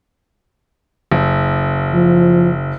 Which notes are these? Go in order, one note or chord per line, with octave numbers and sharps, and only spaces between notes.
F#1
F3